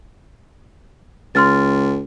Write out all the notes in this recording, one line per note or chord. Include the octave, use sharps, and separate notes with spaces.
C#2 C6 F6 A6